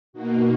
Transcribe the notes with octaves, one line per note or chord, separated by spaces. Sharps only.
B2 A#3 D#4 F#4